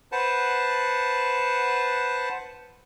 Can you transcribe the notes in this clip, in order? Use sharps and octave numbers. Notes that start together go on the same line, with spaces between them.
B4 C5 F#5 A5